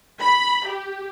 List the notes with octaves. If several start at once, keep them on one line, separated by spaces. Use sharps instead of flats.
B5
G4